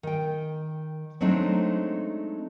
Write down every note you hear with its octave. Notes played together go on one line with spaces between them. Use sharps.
D#3 G5
F#3 G#3 A3 C4 D4 D#4